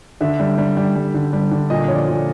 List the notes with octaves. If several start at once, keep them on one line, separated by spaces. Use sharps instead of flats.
D3 E5
G3
G3
G3
G3
D3
G3
D3
A#2 D#5
F3 C#5
D5
A#2